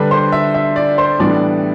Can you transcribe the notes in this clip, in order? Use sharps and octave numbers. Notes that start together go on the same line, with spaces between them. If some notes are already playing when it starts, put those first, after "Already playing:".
Already playing: D3 G3 D4 B4
C5
E5
E5
D5
C5
A2 E3 G3 B3 D4 D5